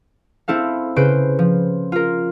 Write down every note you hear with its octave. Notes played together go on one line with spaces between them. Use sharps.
C4 E4 A4 F5
C#3 B4 C5 D7
F3
F4 A#4